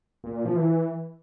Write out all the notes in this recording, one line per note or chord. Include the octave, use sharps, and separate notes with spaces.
A#2
A#2
F3
E3